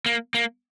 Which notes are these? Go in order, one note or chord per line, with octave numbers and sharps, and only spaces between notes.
A#3
A#3